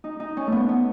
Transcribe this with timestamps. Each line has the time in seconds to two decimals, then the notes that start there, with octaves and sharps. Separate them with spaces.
0.04 D#4
0.20 D#4
0.37 C#4
0.47 A3
0.52 B3
0.69 B3